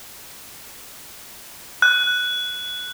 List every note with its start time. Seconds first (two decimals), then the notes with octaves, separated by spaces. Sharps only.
1.82 F#6